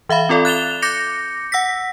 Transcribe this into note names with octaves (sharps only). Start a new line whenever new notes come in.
E3 E5 F5 B5
C4 F4 A4 D5
F#6 A6 E7 F7 G7
D6 G6 A#6 C#7
F#5 E6 A#6 B6